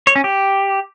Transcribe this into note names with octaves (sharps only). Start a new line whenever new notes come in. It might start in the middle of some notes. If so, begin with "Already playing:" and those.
C#5
C#4
G4